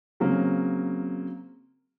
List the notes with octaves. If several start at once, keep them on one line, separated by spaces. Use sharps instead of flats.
C#3 F#3 A#3 C4